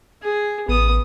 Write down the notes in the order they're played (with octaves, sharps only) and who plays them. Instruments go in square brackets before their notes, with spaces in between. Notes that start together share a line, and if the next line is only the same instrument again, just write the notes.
[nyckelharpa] G#4
[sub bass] A1 [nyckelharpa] B3 D#6